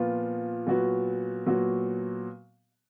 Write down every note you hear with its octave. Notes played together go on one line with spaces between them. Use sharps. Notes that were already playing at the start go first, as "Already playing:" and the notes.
Already playing: A#2 F3 B3 F4
A#2 F#3 B3 F#4
A#2 F#3 B3 F#4